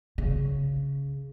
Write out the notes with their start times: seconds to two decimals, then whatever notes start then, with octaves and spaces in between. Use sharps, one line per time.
0.18 C#3